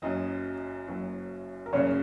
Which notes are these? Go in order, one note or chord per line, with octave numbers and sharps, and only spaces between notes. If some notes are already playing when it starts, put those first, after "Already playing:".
F#1 F#2 F#3 D#5
F#1 F#2 F#3
A#4
F#1 F#2 C#3 F#3 C#5